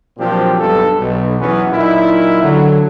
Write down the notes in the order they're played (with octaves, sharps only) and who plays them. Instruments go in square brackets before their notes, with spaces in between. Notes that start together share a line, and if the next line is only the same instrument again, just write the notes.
[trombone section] A#2 F3 F#3 C4 D4 G4
B1 G2 A4
B1
E2 E3 F#3 B3 C#4
A#2 F#3 D#4 E4
D3 F#3